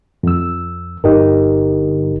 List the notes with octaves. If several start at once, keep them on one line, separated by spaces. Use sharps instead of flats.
F2 E6
G1 D#4 G4 A#4